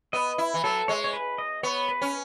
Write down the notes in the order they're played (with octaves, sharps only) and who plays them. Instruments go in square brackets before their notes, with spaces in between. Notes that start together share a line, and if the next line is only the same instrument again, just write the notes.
[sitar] B3 [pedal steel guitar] D#5
[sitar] E4
E3
[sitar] F#3 [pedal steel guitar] A4
[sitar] G#3 [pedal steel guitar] C#5
[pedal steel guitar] C#5
B4
D#5
[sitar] B3 [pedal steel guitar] C#5
[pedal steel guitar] B4
[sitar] C#4